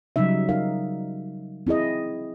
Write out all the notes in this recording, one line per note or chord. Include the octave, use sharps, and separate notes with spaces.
C#3 F#3 G3 D#4 E5
D#4 A#4 F5
C4 E4 G#4 D#5